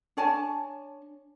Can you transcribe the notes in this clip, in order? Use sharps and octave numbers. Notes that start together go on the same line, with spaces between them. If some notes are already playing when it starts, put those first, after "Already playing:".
D4 C#5 G#5 A5